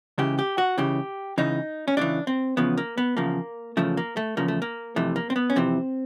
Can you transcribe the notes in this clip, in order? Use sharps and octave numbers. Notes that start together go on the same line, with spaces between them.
C#2 C#3 E3 G4
G4
F#4
C#2 C#3 E3 G4
C#2 C#3 E3 D#4
C#4
C#2 C#3 E3 D4
C4
E2 C#3 F3 B3
A#3
B3
E2 C#3 F3 A#3
E2 C#3 F3 A3
A#3
A3
E2 C#3 F3 A#3
A3
A#3
F2 C3 E3 A3
A#3
C4
B3
C#4
F2 C3 E3 C4